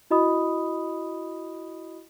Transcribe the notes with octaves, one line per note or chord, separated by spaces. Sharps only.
E4 F#4 D#5 B5 D#6